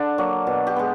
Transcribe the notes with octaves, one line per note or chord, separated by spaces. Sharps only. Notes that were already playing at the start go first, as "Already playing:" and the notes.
Already playing: D3 D4
F#3 A#3
B2
G4
G#3 B3